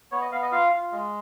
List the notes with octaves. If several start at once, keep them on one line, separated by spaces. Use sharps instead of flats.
B3 C#5
D#5
B3 F5
D#5
F4 F5
F4
G#3